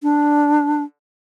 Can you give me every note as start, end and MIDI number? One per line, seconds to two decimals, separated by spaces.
0.03 0.83 62